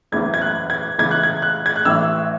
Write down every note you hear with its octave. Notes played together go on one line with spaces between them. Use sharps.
F#1 E2 C#3 E3 G#6
G#6
F#6
G#6
C#2 C#3 E3 G#6
F#6
G#6
F#6
G#6
F#6
A1 A2 E3 E6